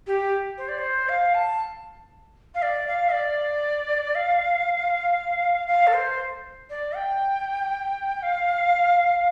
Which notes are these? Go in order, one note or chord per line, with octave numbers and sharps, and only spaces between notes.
G4
C5
D5
C5
F5
A5
F5
D5
F5
D5
F5
F5
A4
C5
D5
G5
F5